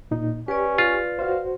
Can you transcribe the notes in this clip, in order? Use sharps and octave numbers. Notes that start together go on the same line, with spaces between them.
A#2 D#4
C#4 G4 B4 D5
F4
F#4 C5 F5